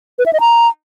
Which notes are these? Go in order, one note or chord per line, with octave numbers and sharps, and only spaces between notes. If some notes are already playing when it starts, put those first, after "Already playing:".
B4
E5
D#5
A#5